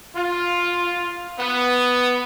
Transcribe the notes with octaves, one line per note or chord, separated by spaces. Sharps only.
F4
B3